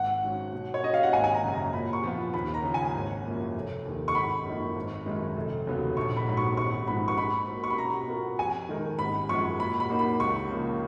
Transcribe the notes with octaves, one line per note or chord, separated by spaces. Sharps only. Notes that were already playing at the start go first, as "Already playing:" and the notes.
Already playing: G#1 F#5
G#2 F#3 C#4
B2
C#5
F#3 C#4 D#5
F5
F#5
G#1 G#5
G#5
A#5
F#2 C#3
A#5
A#2 B5
C#6
F3 B3 F4
D#2 B5
A#5
C#3 F3
G#5
G#1
F#2 F3 A#3 C#4
F1
D#2 D#3
C#6
G#1 B5
F#2 F3 A#3 D#4
G#1
F#2 D#3 G#3 D#4
F1
D#2 C#3 F#3 B3
A#1 C#6
B5
G#2 F#3 B5
C#6
G#1 C#6
G#2 F3 B3 F#4 B5
C#6
G#2 B5
F#3 A#3
C#6
B5
B2 A#5
F#3 B3 F4 A#4
F2 G#5
D#3 G#3 D#4 A#4
G#1 B5
F#2 F3 G#3 C#6
A#2 B5
B5
F#3 A#3 D#4 F#4
B5
C#2 C#6
C#3 F3 A#3